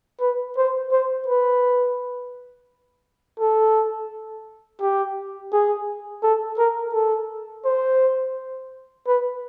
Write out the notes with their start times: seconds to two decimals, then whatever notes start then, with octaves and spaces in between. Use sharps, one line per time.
0.21 B4
0.57 C5
0.92 C5
1.28 B4
3.40 A4
4.81 G4
5.53 G#4
6.23 A4
6.58 A#4
6.94 A4
7.65 C5
9.07 B4